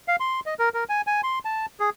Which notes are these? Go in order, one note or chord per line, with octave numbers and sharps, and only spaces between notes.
F5
C6
D#5
A#4
A#4
G#5
G#5
C6
A5
G#4